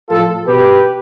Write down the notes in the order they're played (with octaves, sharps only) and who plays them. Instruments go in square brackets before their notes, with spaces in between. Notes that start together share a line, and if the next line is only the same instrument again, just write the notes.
[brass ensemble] A2 F3 F4 A4
B2 G4 B4